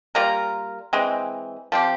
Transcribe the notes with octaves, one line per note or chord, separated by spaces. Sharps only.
G3 A#3 F4 A#4
E3 G#3 C4
F3 C4 G4